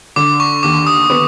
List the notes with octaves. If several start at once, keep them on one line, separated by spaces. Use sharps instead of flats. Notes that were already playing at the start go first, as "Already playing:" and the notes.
D3 D6
C#6
D#2 D6
D#6
B3